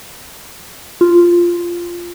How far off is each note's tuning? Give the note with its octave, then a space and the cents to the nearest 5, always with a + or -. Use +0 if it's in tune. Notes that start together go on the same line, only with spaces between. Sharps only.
F4 -5